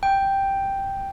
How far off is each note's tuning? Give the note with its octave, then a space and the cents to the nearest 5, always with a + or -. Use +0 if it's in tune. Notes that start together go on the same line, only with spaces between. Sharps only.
G5 +0